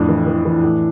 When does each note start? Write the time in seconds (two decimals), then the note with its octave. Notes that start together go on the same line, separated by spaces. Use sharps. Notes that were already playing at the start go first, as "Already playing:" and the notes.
Already playing: F2 A2 D4
0.09 E3
0.26 E3
0.45 E3
0.63 A2